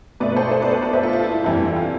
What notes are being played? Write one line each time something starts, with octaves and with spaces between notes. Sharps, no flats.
B2 A3 B4 D5
A4 C5
A4 C5
B4 D5
A4 C5
B4 D5
C5 E5
F4 A4
F4
E4
F2 E3 G3 E4
F4